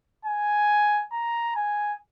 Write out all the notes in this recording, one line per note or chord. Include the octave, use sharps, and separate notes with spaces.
G#5
A#5
G#5